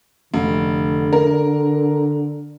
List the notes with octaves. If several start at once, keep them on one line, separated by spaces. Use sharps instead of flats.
F1 D3
A#4